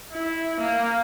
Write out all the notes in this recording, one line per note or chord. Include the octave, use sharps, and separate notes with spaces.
E4
A#3